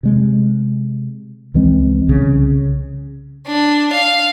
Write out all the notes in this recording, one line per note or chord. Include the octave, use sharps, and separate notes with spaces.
C3 G#3
C#2 E3 G#3 C4
C2 C#3
D4
F5